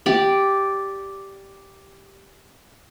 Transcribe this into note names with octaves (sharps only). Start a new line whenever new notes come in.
G4 D5